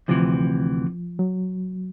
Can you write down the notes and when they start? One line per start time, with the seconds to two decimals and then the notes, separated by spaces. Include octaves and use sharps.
0.08 D2 C3 E3 F3
1.19 F#3